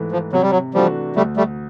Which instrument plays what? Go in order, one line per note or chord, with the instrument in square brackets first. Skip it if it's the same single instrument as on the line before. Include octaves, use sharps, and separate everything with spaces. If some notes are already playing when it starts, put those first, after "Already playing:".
Already playing: [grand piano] G#2 E3 A3
[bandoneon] F3
[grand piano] C3 [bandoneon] F#3
[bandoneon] G3
F#3
[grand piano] E3 A3 D4 F#4 [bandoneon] F3 G3
[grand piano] D2 [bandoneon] G3 A3
[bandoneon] G3 A3